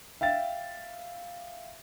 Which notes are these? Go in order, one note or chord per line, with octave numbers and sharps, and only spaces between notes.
E5 F5 G5 A6